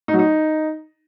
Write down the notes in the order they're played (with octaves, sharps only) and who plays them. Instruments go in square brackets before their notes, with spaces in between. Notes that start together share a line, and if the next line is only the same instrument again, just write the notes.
[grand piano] D#4
F#3
D#4